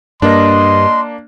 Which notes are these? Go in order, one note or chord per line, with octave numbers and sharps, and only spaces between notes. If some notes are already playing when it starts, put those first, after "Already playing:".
G2 A#3 D4 D#5 C6